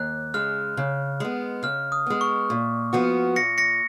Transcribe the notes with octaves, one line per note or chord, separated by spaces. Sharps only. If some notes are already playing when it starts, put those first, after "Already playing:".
Already playing: D#2 F#6
C#3 G#3 F6
C#3
G#3 B3
C#3 F6
D#6
G#3 B3
C#6
A#2
F3 B3 F#4
A#2 A#6 C#7
A#6 C#7